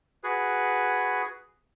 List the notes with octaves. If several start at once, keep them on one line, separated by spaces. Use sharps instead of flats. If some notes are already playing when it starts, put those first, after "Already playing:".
F#4 G#4 B4